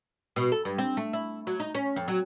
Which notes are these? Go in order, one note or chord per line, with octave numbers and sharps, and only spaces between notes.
B2
A4
G2
C4
A3
E4
F#3
D#4
C#4
F2
F#3